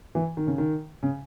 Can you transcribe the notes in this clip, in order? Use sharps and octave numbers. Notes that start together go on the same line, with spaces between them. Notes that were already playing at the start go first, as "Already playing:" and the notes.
E3
D#3
C#3
D#3
C#3